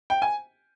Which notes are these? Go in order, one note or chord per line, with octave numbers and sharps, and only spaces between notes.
G5
G#5